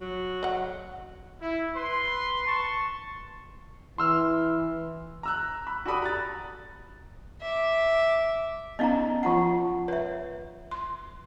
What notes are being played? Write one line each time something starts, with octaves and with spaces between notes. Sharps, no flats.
F#3
D#5 F#5
E4
B4 C6
A5 C#6
E3 C6 E6 F6
A#5 E6 F#6
B5
F#4 G4 A4 D5 B5 D#6
A#5 F#6 A6
E5 D6
B3 C#4 D#4 D#5 F5 A#5
F3 F4 F#5 A5
B4 C#5 E5
C6